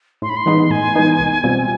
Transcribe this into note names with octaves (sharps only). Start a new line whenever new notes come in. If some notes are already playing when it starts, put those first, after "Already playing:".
A2 C6
B5
C6
E3 G#3 B3 D#4
A2 G#5
E3 G#3 B3 D#4
C2
B2 G3 C4 F4